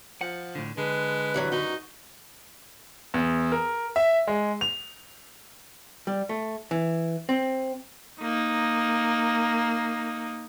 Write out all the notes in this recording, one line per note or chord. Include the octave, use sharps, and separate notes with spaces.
F3 F#5
A2 D3
D3 G#3 B4
G2 E3 F#3
F#2 D#4 F#4
E2
A#4
E5
G#3
F7
G3
A3
E3
C4
A#3 D#4